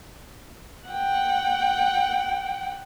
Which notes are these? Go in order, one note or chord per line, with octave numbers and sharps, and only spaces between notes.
F#5 G5